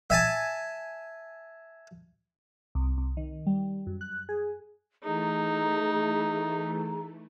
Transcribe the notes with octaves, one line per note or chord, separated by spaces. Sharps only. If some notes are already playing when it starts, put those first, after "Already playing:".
E5 G#5 A5
C2
C2
D#3
G3
F#2
F#6
G#4
E3 A3 D#4 G#4 A#5